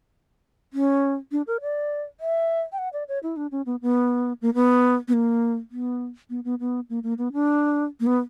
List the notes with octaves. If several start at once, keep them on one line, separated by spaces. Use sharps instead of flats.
C#4
D4
A#4
D5
E5
G5
F#5
D5
C#5
E4
D4
C#4
B3
B3
A#3
B3
B3
A#3
B3
B3
B3
B3
A#3
A#3
B3
D4
A#3
B3